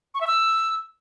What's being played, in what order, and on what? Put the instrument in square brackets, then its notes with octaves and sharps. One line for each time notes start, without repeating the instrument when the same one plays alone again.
[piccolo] C#6
E5
E6